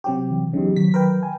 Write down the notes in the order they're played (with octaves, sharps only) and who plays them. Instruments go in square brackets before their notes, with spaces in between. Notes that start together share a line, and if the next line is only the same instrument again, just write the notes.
[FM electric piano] C3 F#3 G4
[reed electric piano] E3
[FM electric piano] E2 C#3 [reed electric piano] F#3 D#4 G4
[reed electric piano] D#3 F#3 [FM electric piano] B6
[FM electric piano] A#4 B4 G5
[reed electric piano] G#5